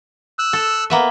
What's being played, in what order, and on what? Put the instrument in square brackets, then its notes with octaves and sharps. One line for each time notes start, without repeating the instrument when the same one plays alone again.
[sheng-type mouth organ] E6 F#6
[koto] A4
A#3 B3 E5